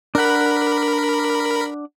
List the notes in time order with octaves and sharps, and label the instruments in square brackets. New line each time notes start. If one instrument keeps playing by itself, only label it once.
[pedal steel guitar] D4 F#5 [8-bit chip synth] A#4 B5